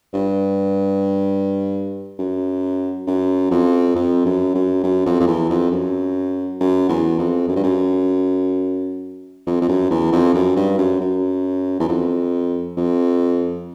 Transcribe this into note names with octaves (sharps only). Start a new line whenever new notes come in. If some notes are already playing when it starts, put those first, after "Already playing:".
G2
F#2
F#2
F2
F2
F#2
F#2
F#2
F2
F2
E2
F2
F#2
F#2
E2
F2
F#2
G2
F#2
F2
F2
F#2
E2
F2
F#2
G2
F#2
F#2
E2
F2
F2